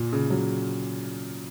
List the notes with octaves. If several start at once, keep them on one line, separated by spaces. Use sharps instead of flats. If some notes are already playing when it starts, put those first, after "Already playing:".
Already playing: A#2
C#3
F#3